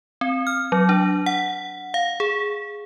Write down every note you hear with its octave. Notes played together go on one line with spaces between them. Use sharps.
C4
F6
F#3
D4
F#5
F5
G#4